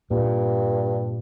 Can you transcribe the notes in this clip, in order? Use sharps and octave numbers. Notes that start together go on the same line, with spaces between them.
G2 A#2